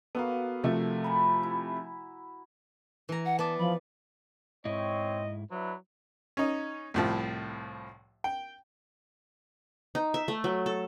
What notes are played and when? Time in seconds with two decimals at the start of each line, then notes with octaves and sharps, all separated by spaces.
0.15 A#3 B3 F#4 A4 F5
0.64 C3 F3 A3 E5
1.04 G#5 A#5 B5
1.43 E4
3.09 E3 A#5
3.25 F#5
3.39 B3 D5 A5
3.58 F3 B5
4.65 G#2 C4 E4 C#5 D#5
5.51 F#3 D4 E4 B4
6.37 C#4 D#4
6.94 C2 A2 F3
8.24 G5
9.95 D#4
10.14 E5
10.28 A3
10.44 F#3
10.66 A4